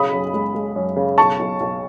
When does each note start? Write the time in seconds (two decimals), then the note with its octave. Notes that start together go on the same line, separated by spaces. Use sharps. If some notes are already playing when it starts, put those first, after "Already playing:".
Already playing: B1 C#3 B5 D#6
0.13 F#2
0.34 G#3
0.55 G#3
0.76 F#2
0.96 C#3
1.18 B1 A5 C#6
1.39 B1
1.60 B1